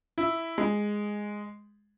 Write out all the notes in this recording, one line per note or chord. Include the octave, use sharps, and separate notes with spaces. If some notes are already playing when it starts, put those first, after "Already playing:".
E4
G#3